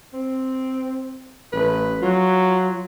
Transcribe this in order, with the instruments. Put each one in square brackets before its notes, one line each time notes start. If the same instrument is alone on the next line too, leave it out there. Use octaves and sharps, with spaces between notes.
[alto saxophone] C4
[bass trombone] A1 [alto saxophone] B4
[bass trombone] F#3 [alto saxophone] F4